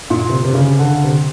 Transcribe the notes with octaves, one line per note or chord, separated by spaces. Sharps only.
A#2
C3
C3
C#3
D3
C3